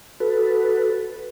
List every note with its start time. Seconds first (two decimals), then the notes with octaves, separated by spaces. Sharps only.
0.20 F#4 A4 B4